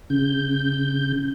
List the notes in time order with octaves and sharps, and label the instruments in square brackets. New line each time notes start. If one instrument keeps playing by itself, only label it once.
[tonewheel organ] C#3 G6